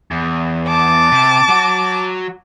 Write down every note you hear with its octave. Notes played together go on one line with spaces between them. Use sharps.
E2
A5 D6
C3
F#3 F#4